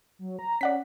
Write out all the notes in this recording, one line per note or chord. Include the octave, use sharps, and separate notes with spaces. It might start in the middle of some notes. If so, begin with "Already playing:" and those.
F#3
A#5
C#4 D5 F#5 B6